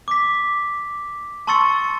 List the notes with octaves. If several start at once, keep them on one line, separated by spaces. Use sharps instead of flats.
D6 B6
A5 C6 C#6 E6 A6 C#7